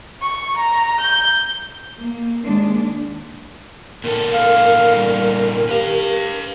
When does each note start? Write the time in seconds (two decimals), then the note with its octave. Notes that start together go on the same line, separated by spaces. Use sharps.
0.22 C#6
0.56 A#5
1.01 G6
1.99 A#3
2.44 D#2 G#3 D4
4.04 A#2 D#3 A4 A#4
4.33 F5
4.96 G3
5.69 G4 B4 F5